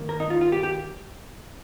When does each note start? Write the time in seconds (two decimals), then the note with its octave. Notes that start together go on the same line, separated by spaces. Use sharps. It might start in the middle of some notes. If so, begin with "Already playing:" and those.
Already playing: G2 D#3 A#3
0.09 A#4
0.20 D#4
0.30 F4
0.41 F4
0.52 G4
0.63 G4